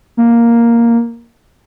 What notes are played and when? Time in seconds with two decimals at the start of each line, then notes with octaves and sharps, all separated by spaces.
0.17 A#3